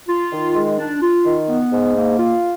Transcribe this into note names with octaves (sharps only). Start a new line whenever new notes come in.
F4
D#3
G#3
D4
F4
D#3
B3
G#2
A#3
F4